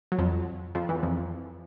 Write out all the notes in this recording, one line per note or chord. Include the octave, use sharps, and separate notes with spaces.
F#3
F2 F3
F2 F3
E2 E3
F2 F3